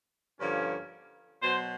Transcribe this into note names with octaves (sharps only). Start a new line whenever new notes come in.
G2 D3 F3 A#3 C#4
B2 F#3 B3 C5